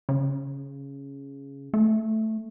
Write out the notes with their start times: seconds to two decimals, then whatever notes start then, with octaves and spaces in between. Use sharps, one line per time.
0.09 C#3
1.74 A3